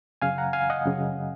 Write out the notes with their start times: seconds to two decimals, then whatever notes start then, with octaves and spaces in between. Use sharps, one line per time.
0.22 F#2 C#3 F5 G#5
0.38 F#5 A#5
0.53 F5 G#5
0.70 D#5 F#5
0.85 F#2 C#3